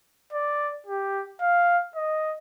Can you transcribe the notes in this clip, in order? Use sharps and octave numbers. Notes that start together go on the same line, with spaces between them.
D5
G4
F5
D#5